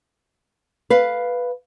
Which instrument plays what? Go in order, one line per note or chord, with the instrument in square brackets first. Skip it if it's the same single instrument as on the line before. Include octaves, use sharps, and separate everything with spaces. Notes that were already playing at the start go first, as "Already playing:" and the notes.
[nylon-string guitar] B4 F5